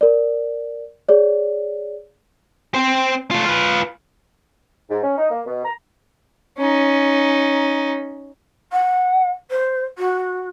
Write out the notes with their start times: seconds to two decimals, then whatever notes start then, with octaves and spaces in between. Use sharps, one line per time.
0.01 A#4 D5
1.09 G#4 C#5 D5
2.74 C4 C5
3.31 A3 F4
3.45 F4 B4
4.90 G#2
5.04 C#4
5.17 D#4
5.31 A#3
5.46 B2
5.65 A#5
6.58 C#4 D#4
8.72 F#5
9.50 C5
9.98 F#4